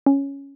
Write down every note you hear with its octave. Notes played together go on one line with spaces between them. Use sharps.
C#4